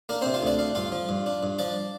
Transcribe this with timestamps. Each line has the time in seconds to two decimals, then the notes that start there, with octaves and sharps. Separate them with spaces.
0.09 A#3 D4 A#4
0.22 C3 C4 C5
0.34 F4 F5
0.43 D2 D4 D5
0.59 D4 F5
0.75 G2 F4 F5
0.92 F3
1.09 G2
1.26 D4
1.43 G2
1.59 F3 D4 D5